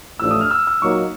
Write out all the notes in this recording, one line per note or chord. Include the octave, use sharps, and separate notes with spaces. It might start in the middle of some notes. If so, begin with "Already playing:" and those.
A1 A2 F3 A3 D4 E6
D#6
F6
E6
E6
A#2 F#3 A#3 D#4 C#6